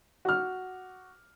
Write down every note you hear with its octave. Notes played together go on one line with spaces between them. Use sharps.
F#4 F6